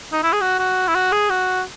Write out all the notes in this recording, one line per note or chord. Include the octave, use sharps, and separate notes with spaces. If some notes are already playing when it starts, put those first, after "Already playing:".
D#4
E4
G#4
F#4
F#4
E4
F#4
G#4
F#4